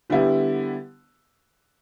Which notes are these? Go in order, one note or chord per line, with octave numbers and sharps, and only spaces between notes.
D3 G3 B3 E4 G4